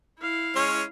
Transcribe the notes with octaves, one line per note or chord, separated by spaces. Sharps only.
E4 F5
G#3 C#4 C#5